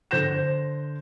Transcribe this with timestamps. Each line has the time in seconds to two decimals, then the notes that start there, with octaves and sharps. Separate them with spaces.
0.11 D3 C5 G6 A#6 E7